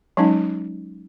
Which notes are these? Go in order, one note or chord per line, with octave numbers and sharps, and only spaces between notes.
F#3 G#3 C#4 D#4